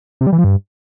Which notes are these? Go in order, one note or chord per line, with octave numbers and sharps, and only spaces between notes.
C3
G3
E3
F3
G2